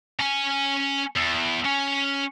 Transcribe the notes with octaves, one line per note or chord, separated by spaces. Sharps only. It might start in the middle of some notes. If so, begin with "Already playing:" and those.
C#4 G#5
E2
C#4